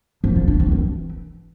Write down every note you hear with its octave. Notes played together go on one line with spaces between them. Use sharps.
F3
F4
D4
F3
E3